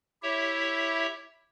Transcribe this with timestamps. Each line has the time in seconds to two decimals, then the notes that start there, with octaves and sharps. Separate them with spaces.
0.23 E4 G4 C#5 E5